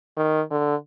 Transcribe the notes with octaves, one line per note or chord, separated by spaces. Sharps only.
D#3
D3